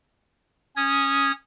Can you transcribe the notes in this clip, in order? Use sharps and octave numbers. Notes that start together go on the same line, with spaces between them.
C#4 D#6 G#6